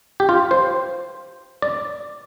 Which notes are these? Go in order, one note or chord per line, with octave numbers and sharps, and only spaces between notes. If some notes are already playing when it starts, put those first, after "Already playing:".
G4
F4
C5
D5